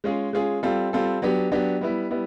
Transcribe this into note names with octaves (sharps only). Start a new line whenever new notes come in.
G#3 C#4 F4 G#4
G#3 C#4 F4 G#4
G3 C4 F4 A4
G3 C4 F4 A4
F#3 B3 D4 G4
F#3 B3 D4 G4
G3 B3 E4
G3 B3 E4